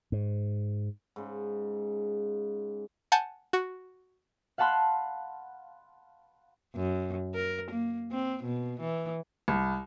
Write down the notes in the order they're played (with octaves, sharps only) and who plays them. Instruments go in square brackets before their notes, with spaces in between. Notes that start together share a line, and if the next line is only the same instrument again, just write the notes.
[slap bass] G#2
[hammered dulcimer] G#2 C#3
[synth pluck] F#5 G#5 A5 G6
F#4
[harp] F5 F#5 A5 B5 C6 F#6
[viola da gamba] F#2
A#4
A#3
C4
B2
E3
[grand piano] C2